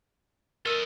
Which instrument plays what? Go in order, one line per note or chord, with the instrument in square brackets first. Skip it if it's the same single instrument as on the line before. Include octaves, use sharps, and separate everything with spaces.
[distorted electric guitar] A4 D#5 [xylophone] A#4 E6